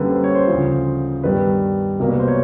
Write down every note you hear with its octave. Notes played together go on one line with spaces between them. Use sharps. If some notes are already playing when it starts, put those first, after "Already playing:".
Already playing: F#2 D3 G3 A#3 B4
C5
C#5
C5
D2 C#3 F3 C5
G2 D#3 G3 B3 B4
C2 B2 F#3 A#3 A#4
B4
C5
C#5